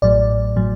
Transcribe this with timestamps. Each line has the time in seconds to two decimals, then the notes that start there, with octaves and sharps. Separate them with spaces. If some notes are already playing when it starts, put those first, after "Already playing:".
0.02 A1 A2 F#3 D5
0.56 A2 F#3